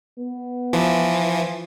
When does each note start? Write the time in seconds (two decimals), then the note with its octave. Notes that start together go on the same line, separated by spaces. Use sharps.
0.19 B3
0.73 E3 F3